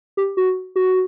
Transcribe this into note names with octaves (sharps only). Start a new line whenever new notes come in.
G4
F#4
F#4